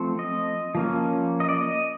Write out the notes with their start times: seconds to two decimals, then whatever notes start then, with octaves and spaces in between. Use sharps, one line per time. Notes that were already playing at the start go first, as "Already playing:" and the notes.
Already playing: F3 A3 C4
0.19 D#5
0.75 F3 A#3 C#4
1.40 D#5
1.49 D5
1.57 D#5